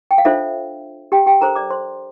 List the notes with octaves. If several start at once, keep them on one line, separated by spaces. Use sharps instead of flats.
G5
F5
D4 F4 A4 C5 E5
G4 G5
G4 G5
D4 A4 A#4 C5 A#5
D5 D6
C5 C6